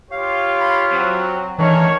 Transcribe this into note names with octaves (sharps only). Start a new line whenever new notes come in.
F4 G4 C#5 F5
F5 B5
F#3 C4
D#3 E3 A3 C#4 D4 C#5